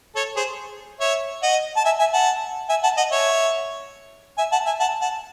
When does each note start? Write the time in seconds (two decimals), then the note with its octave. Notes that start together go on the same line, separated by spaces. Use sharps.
0.15 A4 C#5
0.37 G#4 C5
1.00 C#5 E5
1.43 D#5 F#5
1.76 A5
1.85 E5 G#5
1.99 E5 G#5
2.13 F#5 A5
2.69 E5 G#5
2.83 F#5 A5
2.97 D#5 F#5
3.11 C#5 E5
4.37 E5 G#5
4.52 F#5 A5
4.66 E5 G#5
4.80 F#5 A5
5.02 F#5 A5